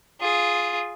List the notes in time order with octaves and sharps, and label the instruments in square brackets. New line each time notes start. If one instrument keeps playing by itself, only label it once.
[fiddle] F4 G#4